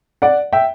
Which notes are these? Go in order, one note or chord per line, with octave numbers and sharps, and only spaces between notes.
D5 F#5
E5 G5